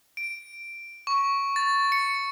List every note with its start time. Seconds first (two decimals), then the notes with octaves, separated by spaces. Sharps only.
0.17 D7
1.07 C#6
1.56 A6
1.92 C#7